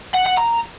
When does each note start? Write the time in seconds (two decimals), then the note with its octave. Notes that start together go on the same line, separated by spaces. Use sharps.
0.14 F#5
0.26 F#5
0.37 A#5